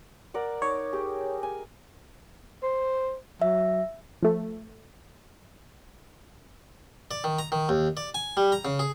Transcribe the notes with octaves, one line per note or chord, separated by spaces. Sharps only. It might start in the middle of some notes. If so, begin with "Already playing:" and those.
A#4 D5 F#5
D#4 C#5 D6
G4 G#4 G5
G#5
C5
F#3 E5
F3 A3
D5
D#3
A#5
D#3
D#2
D5
G#5
G3
A#5
C#3
G#4